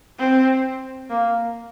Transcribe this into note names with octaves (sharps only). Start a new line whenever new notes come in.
C4
A#3